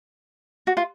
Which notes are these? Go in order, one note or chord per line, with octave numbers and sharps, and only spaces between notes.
F#4
F4